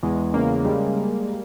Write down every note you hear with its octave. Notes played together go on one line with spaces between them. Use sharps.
E2 G#3
C#3 A#3
G3 G#3